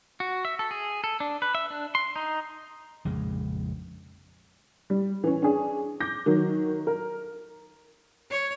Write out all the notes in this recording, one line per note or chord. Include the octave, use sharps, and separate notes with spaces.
F#4
E5
A4
G#4
A4
D4
B4
E5
D4
C6
D#4
A#1 F2 C#3 G#3
G3
E3 C#4
C#4 D4 G#4
D6 G6 A#6
D#3 F#3
A#4
C#5